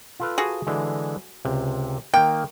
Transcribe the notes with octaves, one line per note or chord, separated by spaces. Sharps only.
F4 A4 B4
F#4 G#4
D3 E3 G#3
C#2 C3
D#3 A#3 G5